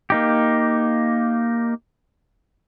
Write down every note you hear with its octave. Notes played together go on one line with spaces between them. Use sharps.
A#3 D#4 G4